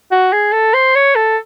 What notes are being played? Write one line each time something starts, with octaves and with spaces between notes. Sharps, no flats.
F#4
G#4
A4
C5
C#5
A4